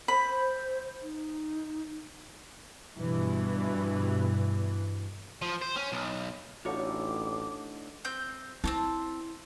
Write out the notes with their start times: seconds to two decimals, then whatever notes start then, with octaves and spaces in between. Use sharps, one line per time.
0.08 C5 B5
1.02 D#4
2.99 G2 B2 E3
5.42 F3
5.62 C5
5.76 C#4
5.92 B1
6.65 A1 A2 D3 D#4 F4 F#4 C#5 D6
8.05 C4 G6
8.64 C4 C#4 E4 A5